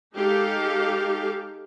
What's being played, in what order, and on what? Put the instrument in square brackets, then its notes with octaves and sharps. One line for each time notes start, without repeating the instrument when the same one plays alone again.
[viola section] G#3 D#4 G4 A4 F5